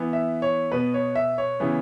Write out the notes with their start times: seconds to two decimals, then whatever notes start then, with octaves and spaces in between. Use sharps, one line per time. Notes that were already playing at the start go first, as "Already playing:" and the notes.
Already playing: E3 B3
0.13 E5
0.42 C#5
0.72 B2 B3 B4
0.94 C#5
1.15 E5
1.38 C#5
1.60 C#3 E3 B3